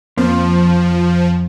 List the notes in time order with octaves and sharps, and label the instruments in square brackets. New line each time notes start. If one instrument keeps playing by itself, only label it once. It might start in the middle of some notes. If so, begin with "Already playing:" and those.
[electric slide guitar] F2 [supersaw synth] F3 [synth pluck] A#3 C4